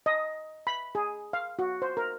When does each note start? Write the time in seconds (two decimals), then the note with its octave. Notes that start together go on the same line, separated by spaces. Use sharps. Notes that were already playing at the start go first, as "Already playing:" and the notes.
0.06 D#5
0.67 B5
0.95 G#4
1.33 F5
1.59 F#4
1.82 C5
1.97 A#4